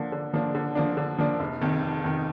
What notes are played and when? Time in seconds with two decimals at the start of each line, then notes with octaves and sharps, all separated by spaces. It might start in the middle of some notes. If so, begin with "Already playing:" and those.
Already playing: D3 F3 A#3 D4
0.12 D3
0.33 F3 A#3 D4
0.55 D3
0.75 F3 A#3 D4
0.97 D3
1.18 F3 A#3 D4
1.39 F1
1.61 F2 D#3
1.82 F1
2.04 F2 D#3